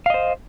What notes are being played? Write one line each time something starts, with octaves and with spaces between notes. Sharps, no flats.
C5 D#5 F5